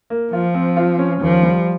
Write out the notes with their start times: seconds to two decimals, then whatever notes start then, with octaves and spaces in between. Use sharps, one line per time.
0.10 A#3
0.32 F3 F4
0.54 C4
0.77 F4
0.99 C#4
1.21 D#2 F3
1.43 G3